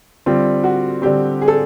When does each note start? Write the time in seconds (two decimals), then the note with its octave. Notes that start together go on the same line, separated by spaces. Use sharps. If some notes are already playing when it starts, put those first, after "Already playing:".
0.26 D3 G3 C4 F4
0.64 F#4
1.02 D3 G3 C4 G4
1.41 G#4
1.48 A4